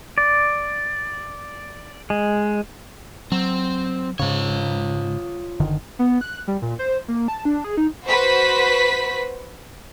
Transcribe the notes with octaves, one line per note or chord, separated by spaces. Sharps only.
D5
G#3
F#3 C4
G#2 C#3 F4 C#5
F#1 D3 D#3
B3
F#6
G3
A#2
C5
A#3
A5
D4
G#4
D#4
F#4 B4 C5 B6